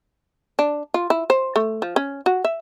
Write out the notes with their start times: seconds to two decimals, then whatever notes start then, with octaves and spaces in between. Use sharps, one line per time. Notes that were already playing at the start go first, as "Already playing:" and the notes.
0.59 D4
0.94 F4
1.10 E4
1.30 C5
1.56 A3
1.82 F3
1.96 C#4
2.26 F#4
2.44 E5